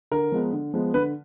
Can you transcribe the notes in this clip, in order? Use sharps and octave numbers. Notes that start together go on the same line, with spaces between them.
D3 A#4
F3 G#3 B3
D3
F3 G#3 B3
D3 B4